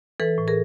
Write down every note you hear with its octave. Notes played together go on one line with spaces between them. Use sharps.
E3 A4 B4
A2
G#4 A#4